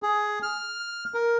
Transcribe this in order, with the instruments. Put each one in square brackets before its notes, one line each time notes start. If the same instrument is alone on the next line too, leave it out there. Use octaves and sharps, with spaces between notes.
[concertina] G#4
F6
A#4